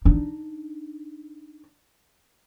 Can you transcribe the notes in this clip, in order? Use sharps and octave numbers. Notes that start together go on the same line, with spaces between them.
D4 D#4